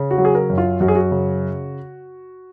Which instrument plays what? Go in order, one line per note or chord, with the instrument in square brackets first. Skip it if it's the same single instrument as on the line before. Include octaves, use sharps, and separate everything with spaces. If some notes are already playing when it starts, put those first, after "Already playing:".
Already playing: [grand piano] C#3
F#4
F#3
G#4
A#4
F#2
F4
F#2 F#4
G#4
F#4
C#3